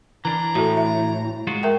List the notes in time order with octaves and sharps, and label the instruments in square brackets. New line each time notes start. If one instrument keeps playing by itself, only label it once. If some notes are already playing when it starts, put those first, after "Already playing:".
[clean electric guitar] E3 D4 [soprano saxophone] A#5
[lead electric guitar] A2 [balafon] F#4 A4
[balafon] E5
[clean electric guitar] G#3 F4 F#4
[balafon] A#4 E5 G5